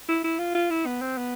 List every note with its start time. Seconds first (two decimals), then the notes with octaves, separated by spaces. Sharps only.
0.09 E4
0.24 E4
0.39 F4
0.55 F4
0.70 E4
0.86 B3
1.02 C4
1.18 B3